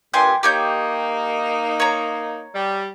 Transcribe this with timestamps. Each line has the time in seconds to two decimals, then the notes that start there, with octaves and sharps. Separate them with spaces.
0.14 G2 A#2 G4 G#5 C6
0.43 A#3 D#4 G4 C#5 G6
1.80 C#5 A#5
2.54 G3